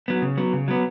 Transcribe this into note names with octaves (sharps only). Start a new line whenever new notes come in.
F#3 B3
C#3
F#3 B3
C#3
F#3 B3